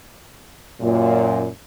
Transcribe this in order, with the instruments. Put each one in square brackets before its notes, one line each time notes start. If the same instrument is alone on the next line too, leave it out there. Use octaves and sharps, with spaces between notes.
[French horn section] F#2 A#2